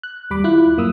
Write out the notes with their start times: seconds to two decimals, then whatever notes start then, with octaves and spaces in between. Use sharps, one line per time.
0.03 F#6
0.30 D#2 G3 B5 D6
0.44 E4 F4 F#6
0.78 F#2 A#3 D#6 E6